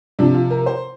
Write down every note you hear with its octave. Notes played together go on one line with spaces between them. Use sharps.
C3 F3 D4
F4
A#4
C5